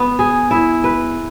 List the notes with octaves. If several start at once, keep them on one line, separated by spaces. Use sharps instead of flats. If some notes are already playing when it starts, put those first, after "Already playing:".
Already playing: B3
G#4
E4
B4